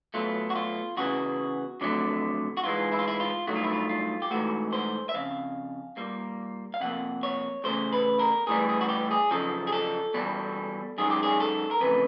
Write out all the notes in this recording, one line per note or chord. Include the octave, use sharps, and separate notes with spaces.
B2 F#3 A3 F4
F#4
F4
E2 C#3 E3 F#4
F2 D3 F#3 A3
F#4
G#2 E3 G#3 F4
E4
F4
E4
F4
G2 D#3 F#3 A3 F#4
F4
E4
F4
F4
G4
G#2 E3 A3 F#4
C5
E5
F2 C#3 F5
A#2 G3 A#3
F5
C3 F3 A#3 F#5
C#5
E2 C#3 F3 A3 C5
B4
A#4
A2 E3 G3 G#4
G#4
F#4
G4
G#4
F#2 C#3 F3 A4
G#4
A4
E2 B2 G3
F#2 D#3 G#3 G#4
G4
G#4
A4
A#4
F2 C#3 E3 A3 B4